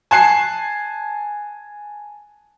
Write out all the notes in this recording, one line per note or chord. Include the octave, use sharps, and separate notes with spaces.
G#5 A5 F#6 G#6 C7